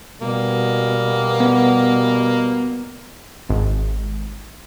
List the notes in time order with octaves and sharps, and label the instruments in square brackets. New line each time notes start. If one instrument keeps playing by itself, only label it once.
[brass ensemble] B2 G3 [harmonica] A#3
[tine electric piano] B3
[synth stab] G#1